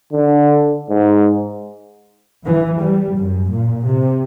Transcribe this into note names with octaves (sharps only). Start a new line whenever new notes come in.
D3
G#2
E3
G3
F#2
A#2
C3